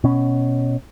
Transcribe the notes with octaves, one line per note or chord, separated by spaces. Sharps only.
B2 C#4